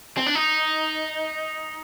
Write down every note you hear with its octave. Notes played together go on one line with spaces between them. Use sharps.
C4
D4
D#4